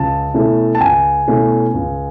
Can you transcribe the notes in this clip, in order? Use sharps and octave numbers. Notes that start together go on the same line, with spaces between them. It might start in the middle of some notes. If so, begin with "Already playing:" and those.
Already playing: C#2 A5
B2 A3 C#4 E4
A5
C#2 G#5
B2 A3 C#4 E4
C#2